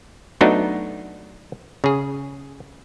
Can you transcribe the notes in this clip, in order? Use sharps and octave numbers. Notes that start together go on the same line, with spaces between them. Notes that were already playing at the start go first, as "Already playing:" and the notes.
F#3 A3 B3 D4 D#4 F#4
C#3 G#4